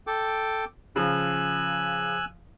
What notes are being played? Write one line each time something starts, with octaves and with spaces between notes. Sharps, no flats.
A4 G5 D6
C#3 F3 G#5 E6 F#6